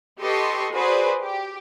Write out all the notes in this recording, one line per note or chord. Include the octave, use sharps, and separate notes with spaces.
G4 A4 B4 D#5 C6 C#6
F#4 G#4 B4 C5 D5
G4